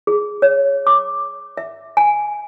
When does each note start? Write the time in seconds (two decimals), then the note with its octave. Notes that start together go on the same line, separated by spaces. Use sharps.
0.07 G#4
0.42 C#5
0.87 D6
1.57 E5
1.97 G#5